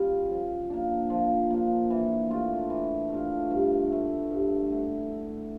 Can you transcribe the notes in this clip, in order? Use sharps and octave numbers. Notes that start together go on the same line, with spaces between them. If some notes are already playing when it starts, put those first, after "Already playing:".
Already playing: G3 C#4 F4
F3
A#3 D4
F3
A#3 D4
E3
A3 D4 F4
E3
A3 D4 F4
G2
D3 A3 E4
G2
D3 A3 E4
D3